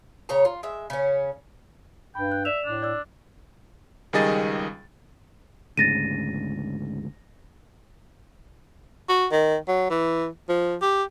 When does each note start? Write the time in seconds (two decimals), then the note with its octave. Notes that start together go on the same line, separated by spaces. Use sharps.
0.29 C#3 C#5 A#5
0.45 F4
0.63 G#3 E5
0.90 C#3 C#4
2.15 G2 G5 B5
2.32 F#6
2.45 D5 E5 E7 F7
2.65 A2 D4
2.82 D5 E6
4.13 C#2 D#3 G3 G#4 D#5 A6
5.77 D2 G#2 C#3 A6 A#6 D#7
9.09 F#4
9.32 D#3
9.68 F#3
9.90 E3
10.49 F3
10.81 G4